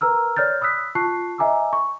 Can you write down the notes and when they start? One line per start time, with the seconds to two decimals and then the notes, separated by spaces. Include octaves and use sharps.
0.01 A#4 B4 A#5 E6 F6
0.37 C#5 D5 F6 G6 A6
0.61 B5 D#6 E6 F#6 B6
0.95 F4 A5 C#6 F#6 C7
1.38 D#5 E5 G#5 A#5 D6 E6
1.73 C#6